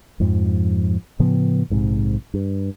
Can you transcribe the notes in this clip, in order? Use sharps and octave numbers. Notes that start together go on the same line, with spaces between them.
F2 G#2 F3
A2 C#3 F3 B3
A#1 G#2 C3
G2